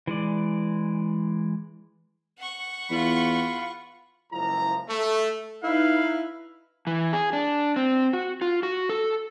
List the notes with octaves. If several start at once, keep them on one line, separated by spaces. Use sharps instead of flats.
E3 G#3 D5
F#5 C#6
E2 F4 B5
F#1 C#2 F3 E4 A#5
A3
D#4 E4 B4 F5
E3
G#4
D4
C4
F#4
F4
F#4
A4